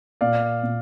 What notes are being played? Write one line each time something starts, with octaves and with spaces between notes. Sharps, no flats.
A#2 D5 F5
A#2